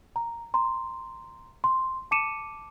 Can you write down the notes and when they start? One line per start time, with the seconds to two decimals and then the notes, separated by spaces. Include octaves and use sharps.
0.16 A#5
0.54 A#5 C6
1.64 C6
2.11 A5 D6 C#7 D#7 E7